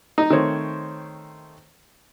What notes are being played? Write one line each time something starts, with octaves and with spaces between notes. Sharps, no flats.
D#4
D#3 A3 C4 C5 C#5